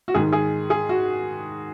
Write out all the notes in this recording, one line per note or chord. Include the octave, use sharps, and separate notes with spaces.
F#4
G#2 D#3 G#4
G#4
G#4
F#4